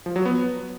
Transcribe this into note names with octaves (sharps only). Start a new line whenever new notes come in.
F3
F#3
B3